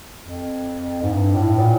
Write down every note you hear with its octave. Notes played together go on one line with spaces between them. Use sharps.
F2
G#2
G2
A2
A#2